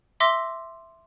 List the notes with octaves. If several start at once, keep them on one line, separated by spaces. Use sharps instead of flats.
E5 C6 D6 E6 A#6 G7